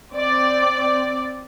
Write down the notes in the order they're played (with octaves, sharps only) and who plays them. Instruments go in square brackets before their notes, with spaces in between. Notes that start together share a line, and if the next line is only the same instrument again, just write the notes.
[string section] C4 D5